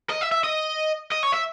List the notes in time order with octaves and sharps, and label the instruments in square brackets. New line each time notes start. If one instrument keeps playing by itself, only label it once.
[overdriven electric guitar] D#5
E5
E5
D#5
D#5
C#5
E5